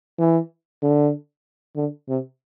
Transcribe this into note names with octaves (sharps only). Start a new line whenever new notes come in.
E3
D3
D3
C3